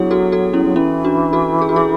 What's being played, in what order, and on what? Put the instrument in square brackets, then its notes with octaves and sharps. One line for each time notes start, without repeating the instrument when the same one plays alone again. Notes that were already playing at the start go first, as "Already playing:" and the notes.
Already playing: [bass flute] F#3 [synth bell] B3 D4 E4 F#4 G#4
[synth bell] F#4 A4
F#4 A4
C#4 E4
[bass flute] F#3
[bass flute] E3 [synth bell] C#4 E4
[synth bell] D4 F#4
F#4 A4
G#4
F#4
E4 G#4